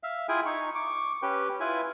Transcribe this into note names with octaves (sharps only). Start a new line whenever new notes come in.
E5 F5
E4 F4 G#4 G5 G#5
D#4 C#6
C#6 D6
C#4 G4 B4 G5
E4 F4 B4 G#5